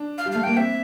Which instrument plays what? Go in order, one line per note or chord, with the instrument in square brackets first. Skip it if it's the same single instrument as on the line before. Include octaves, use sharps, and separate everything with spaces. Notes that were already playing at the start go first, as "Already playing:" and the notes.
Already playing: [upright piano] D4
[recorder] F5
[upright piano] G3
[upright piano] A3 [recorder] F5
[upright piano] A#3 [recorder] G5
[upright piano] C4 [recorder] E5